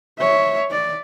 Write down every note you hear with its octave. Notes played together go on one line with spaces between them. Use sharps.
C#5 E5
D5